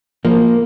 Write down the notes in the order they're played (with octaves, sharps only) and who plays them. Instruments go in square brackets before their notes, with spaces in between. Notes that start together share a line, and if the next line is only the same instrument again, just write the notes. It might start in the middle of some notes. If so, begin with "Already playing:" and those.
[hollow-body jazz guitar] F3 A#3